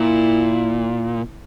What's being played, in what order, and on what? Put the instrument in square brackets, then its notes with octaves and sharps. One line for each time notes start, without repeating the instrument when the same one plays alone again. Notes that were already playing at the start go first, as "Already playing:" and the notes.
Already playing: [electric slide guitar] A#2 [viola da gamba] E4